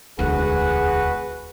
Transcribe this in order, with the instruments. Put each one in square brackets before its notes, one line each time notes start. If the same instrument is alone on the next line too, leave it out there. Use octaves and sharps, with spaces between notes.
[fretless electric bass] E1 D2 [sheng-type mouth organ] F#4 B4 F#5 [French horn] G#4